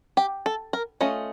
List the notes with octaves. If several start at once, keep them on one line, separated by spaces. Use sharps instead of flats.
G4
A4
A#4
A3 C#4 F4 D#5